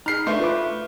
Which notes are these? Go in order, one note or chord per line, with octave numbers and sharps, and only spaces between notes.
D#4 G#4 F6 C7
A3 D4 B4 C6
F4 B4 D6